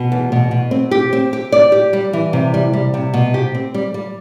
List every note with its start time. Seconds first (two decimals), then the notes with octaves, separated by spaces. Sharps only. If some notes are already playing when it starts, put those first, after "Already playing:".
Already playing: B2
0.12 E2
0.32 B2
0.51 B2
0.71 C4
0.91 G4
1.13 C4
1.33 G4
1.52 D5
1.72 G4
1.93 G3
2.13 E3
2.33 C3
2.54 G3
2.73 G3
2.94 C3
3.14 B2
3.34 G4
3.55 C4
3.74 G3
3.94 G3